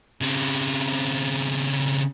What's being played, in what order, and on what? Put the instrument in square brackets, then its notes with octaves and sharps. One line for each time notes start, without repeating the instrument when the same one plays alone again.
[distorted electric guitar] C#3 C4